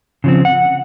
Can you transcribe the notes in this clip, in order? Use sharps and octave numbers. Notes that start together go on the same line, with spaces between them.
C#3 F3 C4
F#5